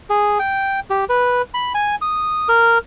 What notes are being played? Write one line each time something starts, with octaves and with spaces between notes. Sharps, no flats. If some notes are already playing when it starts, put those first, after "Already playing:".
G#4
G5
G4
B4
B5
G#5
D#6
A#4